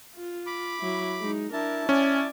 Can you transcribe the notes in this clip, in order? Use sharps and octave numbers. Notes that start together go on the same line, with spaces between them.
F4
B5 D6
F#3 E4
G#3 D#4
D4 E4 A#4 A5
C#4 D5 G#5